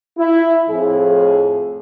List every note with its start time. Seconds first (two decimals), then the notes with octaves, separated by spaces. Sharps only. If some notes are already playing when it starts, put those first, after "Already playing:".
0.18 E4
0.69 F2 A2 G#4